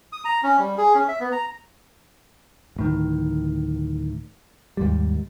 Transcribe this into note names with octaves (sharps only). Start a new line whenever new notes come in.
D#6
A#5
C#4
G3
G#4
C#4
E5
B3
A#5
D1 A2 D#3
D#2 G#2 G3